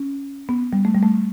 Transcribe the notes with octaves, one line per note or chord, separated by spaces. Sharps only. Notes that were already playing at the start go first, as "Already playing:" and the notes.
Already playing: C#4
B3
G3
A3
G3
A3